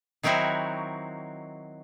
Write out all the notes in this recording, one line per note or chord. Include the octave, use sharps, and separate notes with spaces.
D#3 F#3 C4 D#4 E4 F#4